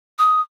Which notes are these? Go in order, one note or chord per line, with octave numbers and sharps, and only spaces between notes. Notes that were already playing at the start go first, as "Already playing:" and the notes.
D#6